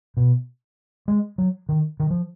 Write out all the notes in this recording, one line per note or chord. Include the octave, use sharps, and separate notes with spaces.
B2
G#3
F#3
D#3
D#3
F3